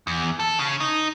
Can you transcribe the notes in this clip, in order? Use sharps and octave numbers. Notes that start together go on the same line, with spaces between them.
E2
A4
C#3
D#4